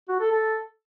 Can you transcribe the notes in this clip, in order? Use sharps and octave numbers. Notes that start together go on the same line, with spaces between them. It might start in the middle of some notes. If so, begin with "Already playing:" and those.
F#4
A4
A4